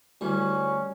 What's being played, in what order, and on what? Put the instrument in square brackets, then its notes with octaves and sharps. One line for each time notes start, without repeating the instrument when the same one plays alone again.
[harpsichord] D2 E3 [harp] G3 [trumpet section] C#4